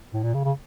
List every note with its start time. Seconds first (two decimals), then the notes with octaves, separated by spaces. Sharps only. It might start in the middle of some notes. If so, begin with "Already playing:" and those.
0.13 A2
0.23 A#2
0.34 C#3
0.44 C#3